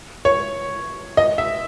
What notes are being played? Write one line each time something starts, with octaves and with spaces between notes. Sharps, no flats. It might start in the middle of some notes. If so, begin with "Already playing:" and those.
C#5
D#5
E5